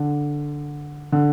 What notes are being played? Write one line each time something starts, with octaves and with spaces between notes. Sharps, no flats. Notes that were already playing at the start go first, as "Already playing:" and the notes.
Already playing: D3
D3